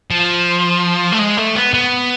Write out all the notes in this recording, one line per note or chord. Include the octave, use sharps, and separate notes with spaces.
F3
A3
G#3
A3
B3
B3